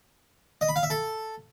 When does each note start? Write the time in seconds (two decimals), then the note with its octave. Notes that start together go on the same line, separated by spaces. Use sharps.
0.61 D#5
0.69 B5
0.76 F5
0.83 E5
0.90 A4